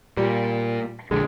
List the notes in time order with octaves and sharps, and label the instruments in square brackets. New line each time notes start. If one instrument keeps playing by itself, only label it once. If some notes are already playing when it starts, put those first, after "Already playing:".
[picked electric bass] A#2 [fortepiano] G3
[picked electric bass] A#1 D3 [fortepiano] G#3